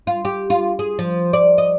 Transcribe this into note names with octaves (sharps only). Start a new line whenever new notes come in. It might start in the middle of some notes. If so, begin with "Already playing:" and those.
F4
G4
F4
G#4
F3
D5
D#5